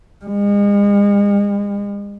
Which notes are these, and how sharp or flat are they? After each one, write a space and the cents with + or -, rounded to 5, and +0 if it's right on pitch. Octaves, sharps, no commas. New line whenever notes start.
G#3 -40